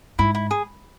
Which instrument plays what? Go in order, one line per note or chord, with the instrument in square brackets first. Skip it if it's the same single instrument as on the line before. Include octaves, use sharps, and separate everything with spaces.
[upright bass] G#2 [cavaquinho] E4
[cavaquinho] E4
G#4